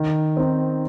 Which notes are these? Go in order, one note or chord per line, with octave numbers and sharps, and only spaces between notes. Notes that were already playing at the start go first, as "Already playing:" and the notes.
Already playing: D#3
C4 D#4